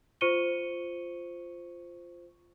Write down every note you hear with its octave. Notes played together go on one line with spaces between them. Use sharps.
F4 C5 C#6 C#7 D#7 G7